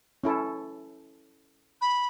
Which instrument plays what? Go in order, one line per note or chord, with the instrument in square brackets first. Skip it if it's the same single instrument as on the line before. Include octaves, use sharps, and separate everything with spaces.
[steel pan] C#4 E4 A4
[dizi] B5